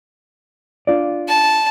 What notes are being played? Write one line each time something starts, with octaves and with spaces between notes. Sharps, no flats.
D4 F4 D5
A5